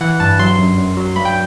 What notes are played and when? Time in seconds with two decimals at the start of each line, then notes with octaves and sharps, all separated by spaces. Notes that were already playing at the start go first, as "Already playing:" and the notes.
0.01 E3 F#5
0.20 G2 A5
0.39 F#3 C6
0.58 F#2
0.78 F#2
0.97 F#3
1.16 G2 B5
1.25 G5